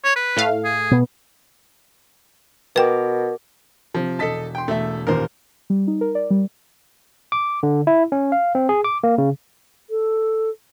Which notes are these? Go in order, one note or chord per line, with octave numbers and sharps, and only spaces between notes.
C#5
B4
A2 A3 F5
G#4
B2 B3
B2 A#4 B4 G5 D6
C3 F3
E1 A4 D#5 A5 B6
G5 C6
E1 A3 E5
A1 D#2 A#2 A#4 C5
G3
D#4
A#4
D5
G3
D6
D3
E4
C#4
F5
C4
G#4
D6
A#3
C#3
A4